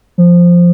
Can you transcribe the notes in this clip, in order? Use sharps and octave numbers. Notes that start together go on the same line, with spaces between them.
F3